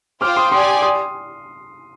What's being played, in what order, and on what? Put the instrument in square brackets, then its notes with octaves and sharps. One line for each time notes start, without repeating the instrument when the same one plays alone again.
[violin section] F4 C5 G5 [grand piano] D6 F6
[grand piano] C6 D#6
[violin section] G4 D5 G#5 [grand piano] C6 D#6
[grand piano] C6 D#6